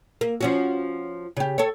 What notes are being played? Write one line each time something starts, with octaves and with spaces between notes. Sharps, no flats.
A#3
F3 C#4 F#4
C#3 G4
A4 C#5